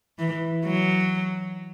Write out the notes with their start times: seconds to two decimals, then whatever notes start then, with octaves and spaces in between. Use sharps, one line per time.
0.19 E3
0.65 F#3